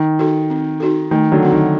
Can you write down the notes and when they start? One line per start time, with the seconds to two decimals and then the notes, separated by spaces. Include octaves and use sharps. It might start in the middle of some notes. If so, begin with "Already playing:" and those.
Already playing: D#3
0.19 D#4 F#4 A4
0.50 C4
0.80 D#4 F#4 A4
1.11 D#3 A3
1.32 D3 F#3
1.42 C4 D#4 F#4
1.52 D#3